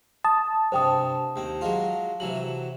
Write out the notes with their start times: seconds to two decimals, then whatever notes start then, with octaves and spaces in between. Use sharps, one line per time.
0.24 A5 D#6
0.72 G2 C3 C5 G5 D#6
1.36 D#2 C4
1.61 F#3 G#3 F4
2.20 C3 E3 F#3 F#7